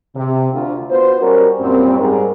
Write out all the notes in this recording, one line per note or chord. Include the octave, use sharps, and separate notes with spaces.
C3
D2 D3 F4
B3 F4 F#4 C5
G3 C#4 F#4 A#4
F#2 A#2 G3 C4
G#2 G3 G#4 A#4